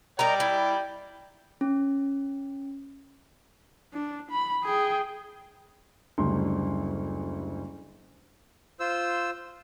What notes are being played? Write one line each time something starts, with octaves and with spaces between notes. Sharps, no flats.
A#4 D5 D#5 G5 A#5
E4
C#4
D4
B5
G#4 G5
F#1 D2 G3 D4 C6
F4 C5 E6